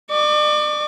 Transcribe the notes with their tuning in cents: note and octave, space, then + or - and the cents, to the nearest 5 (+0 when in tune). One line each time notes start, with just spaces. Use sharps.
D5 +40 D6 -40